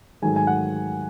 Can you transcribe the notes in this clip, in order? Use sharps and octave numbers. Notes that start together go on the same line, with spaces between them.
G#2 D#3 F#3 A3 G#5
G#5
F#5